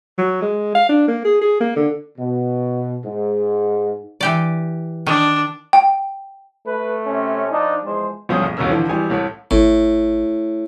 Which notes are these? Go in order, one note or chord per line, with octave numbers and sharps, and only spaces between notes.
F#3
G#3
F5
D4
A#3
G#4
G#4
A#3
D3
B2
G#2
E3 G4 D5
D#3 D4
G5
A3 B4
C3 C#4
F3 D4 D#4
E2 F3 G#3 C5
B1 G2 F3 C#4 D#6
A#1
A1 D#2 B2 C#4 A#4 E6
D3 E3 F3
G#1 E3 G3 G#5
C2 A2
G#1 A2